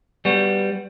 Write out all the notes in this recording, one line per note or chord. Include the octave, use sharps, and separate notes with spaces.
G3 B3 F#4